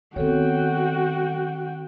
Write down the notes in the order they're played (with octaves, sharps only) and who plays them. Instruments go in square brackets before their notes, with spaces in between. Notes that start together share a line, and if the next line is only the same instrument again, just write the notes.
[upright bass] D#3 B3 [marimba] C4 A4 C#5 [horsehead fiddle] F#4 G5